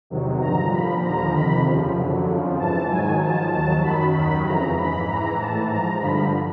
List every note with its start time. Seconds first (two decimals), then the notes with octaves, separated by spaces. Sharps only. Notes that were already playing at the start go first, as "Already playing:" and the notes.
0.10 E2 C3 D#3 F#3
0.41 G2 D3 F3 A#5
0.72 A#2 F3 B5
1.03 D#2 D3 F3 A#5
1.34 F2 C3 D#3 B5
1.65 D#2 C#3 F3
1.97 F#2 D3 F#3
2.27 F2 C#3 F3
2.59 G#2 E3 A5
2.90 G#2 D#3 F#3 G#5
3.21 G#2 F3 A5
3.52 D#2 D#3 F#3 A5
3.82 F#2 D#3 F#3 B5
4.14 D#2 D#3 F#3 B5
4.45 F2 C#3 E3 A#5
4.76 G#2 E3 B5
5.07 G#2 E3 A#5
5.38 A2 E3 A5
5.69 G#2 F3 A#5
6.00 G2 D3 F3 B5